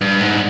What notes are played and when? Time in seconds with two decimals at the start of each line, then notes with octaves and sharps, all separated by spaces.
0.01 G2
0.21 G#2